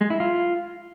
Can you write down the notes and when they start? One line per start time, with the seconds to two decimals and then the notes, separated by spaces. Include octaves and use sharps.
0.01 G#3
0.10 E4
0.20 F4